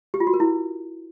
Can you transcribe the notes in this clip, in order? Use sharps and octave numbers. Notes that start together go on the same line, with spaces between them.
G4
F4
F#4
A#4
E4